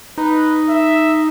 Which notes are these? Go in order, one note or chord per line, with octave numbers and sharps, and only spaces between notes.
D#4 B4
E5